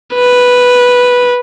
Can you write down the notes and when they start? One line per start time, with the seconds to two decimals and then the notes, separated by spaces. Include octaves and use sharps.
0.15 B4